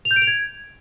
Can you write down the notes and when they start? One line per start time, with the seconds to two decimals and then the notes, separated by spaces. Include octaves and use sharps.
0.05 F7
0.11 G6
0.16 D7
0.22 F7
0.27 G#6